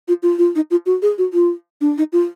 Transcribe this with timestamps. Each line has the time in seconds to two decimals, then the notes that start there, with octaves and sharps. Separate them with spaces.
0.08 F4
0.23 F4
0.39 F4
0.56 D#4
0.71 F4
0.86 F#4
1.02 G#4
1.18 F#4
1.34 F4
1.81 D4
1.98 D#4
2.13 F4